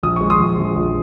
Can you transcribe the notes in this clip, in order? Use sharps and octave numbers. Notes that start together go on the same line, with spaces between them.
A#1 D#6
G#3 C#6
C6 D#6
A#1
A#1
A#1